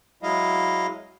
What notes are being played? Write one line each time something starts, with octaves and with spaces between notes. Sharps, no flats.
F#3 G#3 E4 D#5 F5